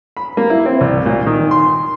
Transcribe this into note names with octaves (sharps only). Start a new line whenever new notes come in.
B5
A#3
E4
C4
C2
A#2
D#3
C6